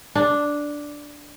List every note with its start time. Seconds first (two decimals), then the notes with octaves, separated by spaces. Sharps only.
0.15 D4